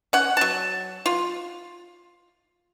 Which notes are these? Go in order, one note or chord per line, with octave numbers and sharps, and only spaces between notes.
C#4 F#5
F#3 A5
F4